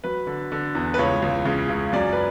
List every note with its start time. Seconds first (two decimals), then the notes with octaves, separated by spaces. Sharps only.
0.04 F#3 B4
0.27 D3
0.52 D3
0.75 E2
0.94 B4
0.98 C#2 C#5
1.22 C#2
1.45 C#3
1.69 C#2
1.93 F#2 D5
2.13 B4